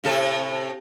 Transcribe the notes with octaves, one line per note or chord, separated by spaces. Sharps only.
A2 C3 A4